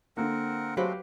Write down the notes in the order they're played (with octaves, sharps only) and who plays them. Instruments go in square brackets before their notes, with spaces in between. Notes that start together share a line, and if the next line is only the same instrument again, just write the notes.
[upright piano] D3 A#3 [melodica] C4 A#4 F#5
[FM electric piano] F#3 [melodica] G#3 A3 C4 [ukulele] G4 B4 C5 [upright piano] F5